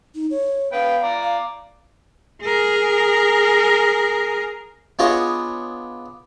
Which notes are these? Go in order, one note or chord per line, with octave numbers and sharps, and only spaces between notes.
D#4
C#5
B3 B4 F5 G5
D5 A#5
F5
G#4 A#4
B3 D4 F4 G#4 C#5 D#5